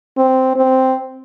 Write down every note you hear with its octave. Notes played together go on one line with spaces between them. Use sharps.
C4
C4